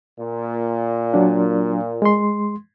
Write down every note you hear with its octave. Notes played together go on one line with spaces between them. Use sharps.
A#2
F#3 D4
G#3 C6